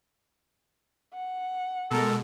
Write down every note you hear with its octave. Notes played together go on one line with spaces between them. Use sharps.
F#5
B2 G#3 A4 A#4